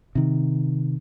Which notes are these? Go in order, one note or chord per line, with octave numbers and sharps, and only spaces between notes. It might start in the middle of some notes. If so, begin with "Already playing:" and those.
C3 D#3